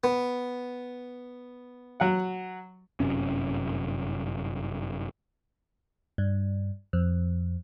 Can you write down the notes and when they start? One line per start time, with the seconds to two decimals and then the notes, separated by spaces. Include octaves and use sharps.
0.04 B3
2.00 F#3 F#5
3.00 G1 F#2 C3 C#4
6.18 G2
6.93 F2